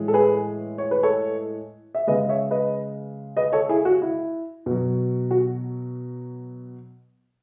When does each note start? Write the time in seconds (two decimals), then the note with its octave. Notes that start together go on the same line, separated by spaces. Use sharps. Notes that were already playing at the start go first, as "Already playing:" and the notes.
Already playing: A2 E3 G#3
0.08 A4
0.14 G#4 B4
0.78 C#5
0.91 B4
1.03 A4 C#5
1.95 E5
2.07 C#3 G#3 B4 D#5
2.29 C#5 E5
2.51 B4 D#5
3.37 B4 D#5
3.53 A4 C#5
3.69 E4 G#4
3.85 F#4
4.02 E4
4.66 B2 F#3
5.31 F#4